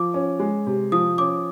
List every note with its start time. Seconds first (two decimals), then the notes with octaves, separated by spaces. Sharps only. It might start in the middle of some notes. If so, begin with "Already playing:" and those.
Already playing: F3 D6
0.14 C#4
0.39 G#3
0.67 C3
0.92 F3 D#6
1.18 C#4 D6